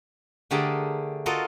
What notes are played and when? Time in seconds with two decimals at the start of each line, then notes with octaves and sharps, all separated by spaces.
0.51 D3 A3 G4 G#4 A#4 A5
1.26 F4 F#4 A4 A#4 D#5